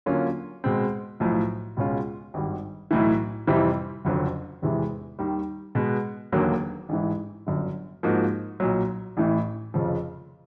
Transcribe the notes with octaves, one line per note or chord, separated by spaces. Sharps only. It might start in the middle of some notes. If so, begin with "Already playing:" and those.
D3 F#3 A#3 C#4 F4
B2 G#3 C4
B1 A2 F3
C#2 B2 G#3 C#4 F4
G#1 G2 D#3 G3
B1 A2 E3
F2 C3 E3 G3 C4
F#1 F2 D3 F#3
E1 E2 C3 E3 G#3
D#2 D#3 G3
B2 G#3 B3
E1 D#2 D3 F#3 A#3
A1 G#2 E3
G1 F#2 D3
G#2 F3 A#3 D#4 F#4
B1 A#2 F#3
A1 A2 E3
F1 F2 C#3 F3